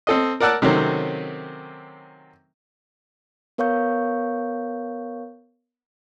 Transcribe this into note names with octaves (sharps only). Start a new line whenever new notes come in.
C4 A4 D#5
A#4 D5 F#5 A5 E6 F#6
C3 D#3 F#3 A3 C4 C#4
B3 A#4 C#5 F5 C#6 G6